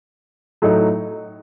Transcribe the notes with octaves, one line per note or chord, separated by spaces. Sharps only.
A2 F#3 A3 D#4